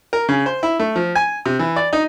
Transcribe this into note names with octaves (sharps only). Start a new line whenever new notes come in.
A#4
C#3
C5
E4
A3
F3
G#5
C3
E3
D5
D#4